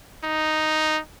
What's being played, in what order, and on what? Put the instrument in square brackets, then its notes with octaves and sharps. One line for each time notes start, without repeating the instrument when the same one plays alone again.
[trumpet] D#4